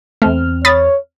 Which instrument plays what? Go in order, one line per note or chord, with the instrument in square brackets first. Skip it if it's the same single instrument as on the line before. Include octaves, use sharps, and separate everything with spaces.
[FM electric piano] E2 C4 F6 [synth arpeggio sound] A3
[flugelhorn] C#5 [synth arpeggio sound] B5 D#6 A6